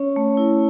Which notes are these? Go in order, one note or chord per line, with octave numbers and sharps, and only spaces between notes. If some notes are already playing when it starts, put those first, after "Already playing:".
Already playing: C#4 C#5
A3
E4